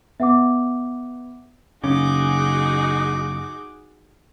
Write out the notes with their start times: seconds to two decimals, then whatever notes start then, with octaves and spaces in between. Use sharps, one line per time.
0.20 B3 E5 F#5 D6
1.84 F#1 C#3 C#4 D#4 F#4 G#4 D6